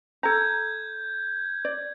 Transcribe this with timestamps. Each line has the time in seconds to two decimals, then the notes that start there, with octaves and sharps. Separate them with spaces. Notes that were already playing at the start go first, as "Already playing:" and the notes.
0.23 A4 A#5 G6 G#6
1.65 D5